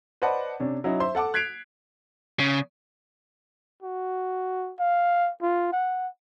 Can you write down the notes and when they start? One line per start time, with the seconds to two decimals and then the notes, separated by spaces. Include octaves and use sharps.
0.22 B4 C5 D5 D#5 F#5 A5
0.60 C3 C#4 D4
0.84 F#3 C#4 D#4 E4
1.00 C5 E5 C6
1.15 A4 F#5 A5 D6
1.34 F#6 G#6 B6 C7 D7 F7
2.40 C#3
3.83 F#4
4.80 F5
5.42 F4
5.72 F#5